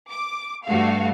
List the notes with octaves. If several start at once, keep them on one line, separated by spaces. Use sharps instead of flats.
D6
G2 A3 F#4 F5